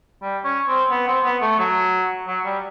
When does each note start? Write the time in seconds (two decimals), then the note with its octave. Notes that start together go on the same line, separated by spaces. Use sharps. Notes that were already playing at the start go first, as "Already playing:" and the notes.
0.22 G3
0.44 C#4
0.68 C4
0.91 B3
1.07 C4
1.24 B3
1.42 A3
1.59 F#3
2.27 F#3
2.45 G3